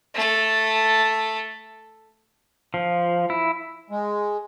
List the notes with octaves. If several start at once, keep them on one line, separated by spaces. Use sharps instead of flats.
A3 A4
F3
E4
G#3